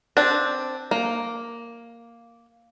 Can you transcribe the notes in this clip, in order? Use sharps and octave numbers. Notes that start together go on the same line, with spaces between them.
C4 D4
A#3